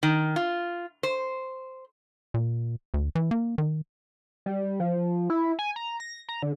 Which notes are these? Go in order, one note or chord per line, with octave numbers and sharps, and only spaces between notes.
D#3
F4
C5
A#2
D2
E3
A#3
D#3
G3
F3
E4
G#5
A#5
A#6
A#5
D3